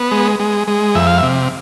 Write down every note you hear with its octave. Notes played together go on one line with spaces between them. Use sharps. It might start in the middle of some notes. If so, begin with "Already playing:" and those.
Already playing: B3
G#3
G#3
G#3
F2 E5
F5
E5
C3